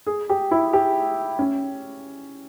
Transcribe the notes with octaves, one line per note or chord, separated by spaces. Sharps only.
G#4
G4
E4
G4
C#4